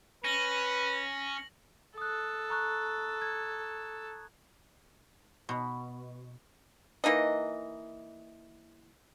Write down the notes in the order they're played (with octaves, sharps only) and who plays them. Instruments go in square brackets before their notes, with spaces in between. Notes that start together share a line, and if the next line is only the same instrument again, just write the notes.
[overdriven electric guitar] C#4 [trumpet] B4 [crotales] A#6 F#7
[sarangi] A4 [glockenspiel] D#6 F#6
[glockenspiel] A#5 C#6 F#6
G#6
[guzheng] B2
[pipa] E3 A#3 D#4 D#5